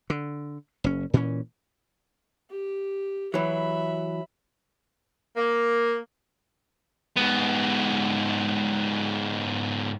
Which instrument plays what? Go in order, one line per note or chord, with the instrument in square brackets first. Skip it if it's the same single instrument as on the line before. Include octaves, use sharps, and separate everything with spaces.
[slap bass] D3
F#1 C#4
A#2 E3 C4 C#4
[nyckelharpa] G4
[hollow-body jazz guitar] E3 F#3 [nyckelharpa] E5 B5
[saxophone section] A#3
[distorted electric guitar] G#2 B3